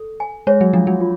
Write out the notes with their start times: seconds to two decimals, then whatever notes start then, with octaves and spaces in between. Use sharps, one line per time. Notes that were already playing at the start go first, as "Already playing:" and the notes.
Already playing: A4
0.20 G#5
0.47 G#3 C#5
0.61 F#3
0.73 F3 D4
0.87 F#3
1.00 F4